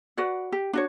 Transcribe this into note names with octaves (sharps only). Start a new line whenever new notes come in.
F#4 B4 D5 F#5
G4
D4 F#4 C#5